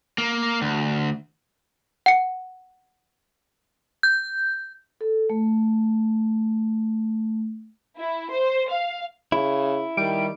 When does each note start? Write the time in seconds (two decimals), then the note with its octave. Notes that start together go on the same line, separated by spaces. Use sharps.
0.18 A#3
0.62 D2
2.06 F#5 C#7
4.03 G6
5.01 A4
5.30 A3
7.97 E4
8.30 C5
8.69 F5
9.32 C#3 E4
9.97 D#3 G3 D7